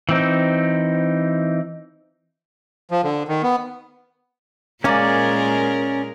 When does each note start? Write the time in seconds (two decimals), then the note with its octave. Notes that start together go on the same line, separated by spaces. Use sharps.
0.09 E3 C4 D#4
2.91 F3
3.04 D3
3.28 D#3
3.43 B3
4.84 A#2 G#3 A#3 C#4 A#4 D5 G#5